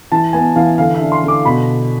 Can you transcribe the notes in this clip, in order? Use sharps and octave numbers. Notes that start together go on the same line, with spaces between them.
E3 A5
B3 G#5
E3 F5
D3 F5
E5
D4
C6
D3
D6
B2 B5